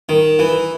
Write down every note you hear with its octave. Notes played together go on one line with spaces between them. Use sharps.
D#3
E3